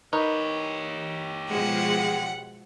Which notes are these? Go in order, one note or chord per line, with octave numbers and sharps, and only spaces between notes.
D#4 G4 A#4 B4 C#5
B2 F3 G#3 F#5